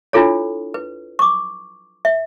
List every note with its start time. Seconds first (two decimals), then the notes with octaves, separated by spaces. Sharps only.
0.13 D4 E4 F4 A4 C#5
0.74 B4
1.19 C#6 D6
2.05 E5